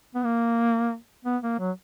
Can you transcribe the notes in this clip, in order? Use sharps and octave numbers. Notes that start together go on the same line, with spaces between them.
B3
A#3
B3
A#3
F#3